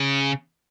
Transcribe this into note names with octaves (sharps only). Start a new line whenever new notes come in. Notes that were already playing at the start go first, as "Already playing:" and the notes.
Already playing: C#3